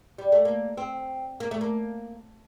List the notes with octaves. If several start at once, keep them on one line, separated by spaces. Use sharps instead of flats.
G3
A3
A#3
C4
A#3
A3
A#3